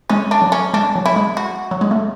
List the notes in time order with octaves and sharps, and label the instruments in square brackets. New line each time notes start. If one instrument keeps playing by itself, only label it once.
[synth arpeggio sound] G#3 [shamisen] C#4
[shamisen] D4
[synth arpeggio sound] F#3
[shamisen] C#4
[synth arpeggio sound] G#3 [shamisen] D4
[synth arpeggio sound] F#3
[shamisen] E4
[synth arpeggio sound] G#3
[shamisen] F#4
[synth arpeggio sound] F#3
G#3
A3